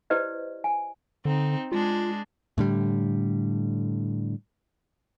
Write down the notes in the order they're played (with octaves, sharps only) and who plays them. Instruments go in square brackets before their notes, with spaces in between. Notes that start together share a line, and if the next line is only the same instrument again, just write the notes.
[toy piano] E4 G4 B4 C5 D5 D#5
G#5
[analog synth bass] D3 [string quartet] C4 D#4
[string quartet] G#3 D4 G#4 [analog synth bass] F4
[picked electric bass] A2 D3 G3